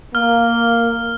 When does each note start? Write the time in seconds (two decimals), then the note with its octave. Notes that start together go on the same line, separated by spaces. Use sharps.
0.15 A#3 F6